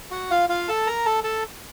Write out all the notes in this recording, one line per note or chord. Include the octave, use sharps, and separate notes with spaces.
F#4 F#5
F4 F5
F4 F5
A4 A5
A#4 A#5
A4 A5
A4 A5